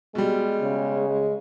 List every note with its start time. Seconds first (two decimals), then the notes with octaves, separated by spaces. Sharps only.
0.15 B2 G3 G#3
0.62 C#3
1.09 G#3